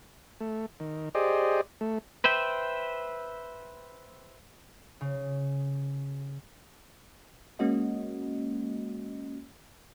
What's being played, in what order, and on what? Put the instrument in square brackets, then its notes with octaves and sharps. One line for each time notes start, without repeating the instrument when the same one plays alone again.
[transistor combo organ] A3
D#3
G4 G#4 C5 D5 D#5
A3
[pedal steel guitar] B4 C5 E5 G5
[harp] C#3
[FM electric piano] G#3 A#3 C#4 F#4 D#5